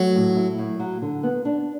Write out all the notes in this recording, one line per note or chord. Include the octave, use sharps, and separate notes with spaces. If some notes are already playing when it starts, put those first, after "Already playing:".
Already playing: F#3 A3
A2
E4
A2
F#3
D3
B3
D4